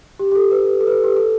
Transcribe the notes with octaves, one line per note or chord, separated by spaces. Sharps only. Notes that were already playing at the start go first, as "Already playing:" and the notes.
G4
G4
A4
B4
A4
B4
A4
G4
A4